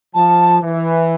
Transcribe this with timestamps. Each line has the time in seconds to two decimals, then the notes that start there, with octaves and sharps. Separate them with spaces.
0.15 F3 A5
0.61 E3